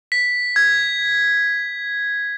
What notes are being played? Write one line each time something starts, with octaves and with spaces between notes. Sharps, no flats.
B6
G#6